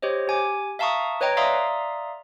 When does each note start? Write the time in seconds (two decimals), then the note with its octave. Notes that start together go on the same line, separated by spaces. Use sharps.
0.02 G4 C5 C#5 D#5
0.27 G4 G#5 D6
0.79 E5 F5 A5 A#5 C#6 D#6
1.21 B4 C#5 D#5 G5 A#5
1.37 D5 E5 F5 A#5 C6 D#6